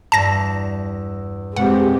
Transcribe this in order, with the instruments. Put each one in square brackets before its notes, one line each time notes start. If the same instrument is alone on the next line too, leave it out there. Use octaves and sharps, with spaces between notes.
[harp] E2 G2 [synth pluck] A5 A#6
[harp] F2 B2 [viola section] G#3 C4 G4 [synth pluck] F#5